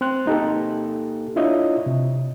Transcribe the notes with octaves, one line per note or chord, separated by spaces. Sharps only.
C4 C6 F#6
A#3 D#4 G4 A4
D4 E4 F4 C#5 D#5 E5
C3